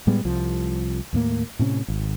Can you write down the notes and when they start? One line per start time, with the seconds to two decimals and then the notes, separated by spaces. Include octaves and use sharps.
0.07 A2 G3 G#3 B3
0.25 C2 F3
1.13 D#2 A2 A#3
1.59 A2 C3 C#4
1.88 G#1